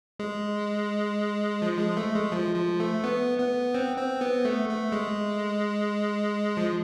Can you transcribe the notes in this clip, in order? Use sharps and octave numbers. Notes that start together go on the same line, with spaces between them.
G#3
F3
G#3
A3
G#3
F3
F3
A3
B3
B3
C4
C4
B3
A3
A3
G#3
F3